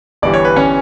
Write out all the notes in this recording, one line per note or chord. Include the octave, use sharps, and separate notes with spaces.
G1 G2 E3 G3 D5
C#5
B4
C#4 C#5